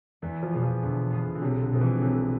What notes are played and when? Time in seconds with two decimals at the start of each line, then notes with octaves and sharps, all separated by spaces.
0.22 E2 E3
0.43 F3
0.52 B2 E3 B3 F4 G#4
0.63 F3
0.82 E2 D3
1.10 B2 B3 F4 G#4
1.35 D3
1.42 B1 C3
1.61 D3
1.72 B2 F3 G#3 C4
1.81 E3
1.97 D3
2.01 B1 C3